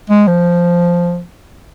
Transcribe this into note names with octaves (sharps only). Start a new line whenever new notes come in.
G#3
F3